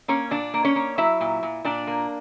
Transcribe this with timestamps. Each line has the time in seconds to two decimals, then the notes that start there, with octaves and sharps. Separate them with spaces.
0.08 A#3 C#4 C#5
0.31 A#2 D4 D5
0.54 A#3
0.64 C#4 C#5
0.76 A#3
0.98 F#3 E4 E5
1.21 A#2
1.43 A#2
1.64 A#2 D4 D5
1.87 A#3